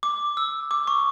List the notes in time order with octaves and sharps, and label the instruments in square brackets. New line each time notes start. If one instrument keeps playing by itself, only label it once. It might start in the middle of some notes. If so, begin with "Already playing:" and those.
[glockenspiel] D6
E6
D6
C#6